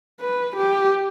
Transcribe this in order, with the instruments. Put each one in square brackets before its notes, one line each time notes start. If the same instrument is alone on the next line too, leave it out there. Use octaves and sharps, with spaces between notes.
[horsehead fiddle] B4
G4